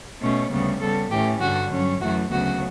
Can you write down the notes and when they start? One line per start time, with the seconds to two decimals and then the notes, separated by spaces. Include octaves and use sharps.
0.20 B2 A3 C#4
0.51 D2 C#3 G3 B3
0.80 C#3 G3 B3 A4
1.10 A2 E3 A3 C#4 G4
1.40 G2 D3 G3 F#4
1.71 G2 F#3 C#4
2.01 F#2 E3 A3 F#4
2.30 D2 C#3 F#3 B3 F#4